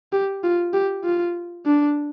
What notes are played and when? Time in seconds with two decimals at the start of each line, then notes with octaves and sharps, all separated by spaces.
0.13 G4
0.43 F4
0.73 G4
1.04 F4
1.66 D4